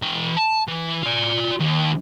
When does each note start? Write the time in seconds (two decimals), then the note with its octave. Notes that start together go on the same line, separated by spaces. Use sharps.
0.02 E3 G5
0.37 A5
0.68 E3
1.03 F4 D5
1.60 D#2